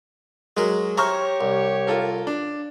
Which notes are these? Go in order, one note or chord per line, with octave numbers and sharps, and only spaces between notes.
F#3 G#3 A#4
G4 C5 C#5 E5 A#5 C#6 F6
C2
F4 A4 A#4
D4